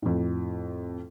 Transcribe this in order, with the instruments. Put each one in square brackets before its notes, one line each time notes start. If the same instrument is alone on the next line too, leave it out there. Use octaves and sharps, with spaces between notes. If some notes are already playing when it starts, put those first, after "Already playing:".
[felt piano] F2 A2